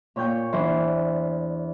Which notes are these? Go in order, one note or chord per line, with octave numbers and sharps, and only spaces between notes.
A#2 C#5 G5 G6
E2 E3 D4 C5